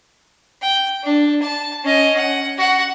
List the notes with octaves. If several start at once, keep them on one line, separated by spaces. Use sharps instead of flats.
G5
D4
A5
C#4 D#5
F#5
F#4 F#5